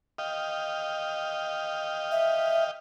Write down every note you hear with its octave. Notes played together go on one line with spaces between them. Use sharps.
D#5 F5 G5
E5